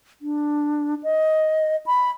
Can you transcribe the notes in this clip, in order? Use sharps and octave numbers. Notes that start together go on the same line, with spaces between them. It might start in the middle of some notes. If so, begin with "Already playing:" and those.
D4
D#5
B5